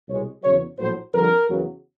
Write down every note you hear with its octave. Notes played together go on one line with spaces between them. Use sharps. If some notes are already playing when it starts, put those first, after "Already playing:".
C2 B2 G#3 C#5
E2 C#3 F#3 C#5
A#1 A2 F#3 C5
F2 D3 G3 A#4
E2 C#3 F#3